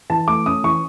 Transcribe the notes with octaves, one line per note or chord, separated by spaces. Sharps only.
E3 A5
A3 D6
C#4 D#6
E3 C#6